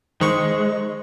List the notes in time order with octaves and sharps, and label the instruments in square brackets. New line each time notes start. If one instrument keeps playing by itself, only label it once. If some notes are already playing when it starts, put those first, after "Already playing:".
[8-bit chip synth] D#3 C#6 [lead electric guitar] G#3 [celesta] C5